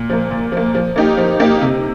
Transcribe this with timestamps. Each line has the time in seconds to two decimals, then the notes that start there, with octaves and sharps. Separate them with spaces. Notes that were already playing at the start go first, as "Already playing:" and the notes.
Already playing: A#2
0.10 F3 A#3
0.31 A#2
0.52 F3 A#3
0.75 F3
0.96 A#3 D#4 G4
1.17 F3
1.40 A#3 D#4 G4
1.61 C3